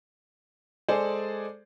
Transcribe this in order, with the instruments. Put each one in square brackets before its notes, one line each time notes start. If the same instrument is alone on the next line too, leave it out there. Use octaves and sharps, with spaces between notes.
[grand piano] G#3 G#4 A4 C5 D5